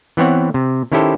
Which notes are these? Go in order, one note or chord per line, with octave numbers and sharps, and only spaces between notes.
E3 B3 C4 C#5 F#5
C3
D#3 C#4 E4 G4 A4 C5